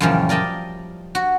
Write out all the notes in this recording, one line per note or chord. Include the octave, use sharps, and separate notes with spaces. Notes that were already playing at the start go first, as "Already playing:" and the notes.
F#2 A#2 C#3 E3 F3 G3
A#4 D5 D#5 G5 A5
F#4